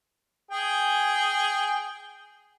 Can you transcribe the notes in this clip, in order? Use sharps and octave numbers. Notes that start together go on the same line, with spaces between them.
G#4 G5 G#5